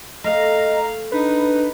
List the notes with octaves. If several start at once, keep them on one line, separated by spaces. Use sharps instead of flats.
A3 D#5 F5 A#5
D4 D#4 B4